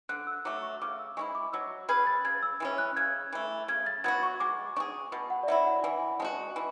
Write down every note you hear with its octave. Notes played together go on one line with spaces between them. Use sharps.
D3 F#6
E6
F#3 A3 D6
C#6
C#3 D6
E6
G#3 C#4 E4 C#6
D6
F#3 E6
C#4 G#4 B4 G#6
A6
C#3 G#6
E6
E3 G#3 C#4
F#6
C#3 G#6
E3 A3
C#3 G#6
A6
F#3 B3 F#4 G#6
C#6
G#3 D6
D4 G#4 C#6
B2
F#5
D5
F#3 A3 E4 E5
F#5
E3 G#5
G#3 C#4 F#4 A5
E3 G#5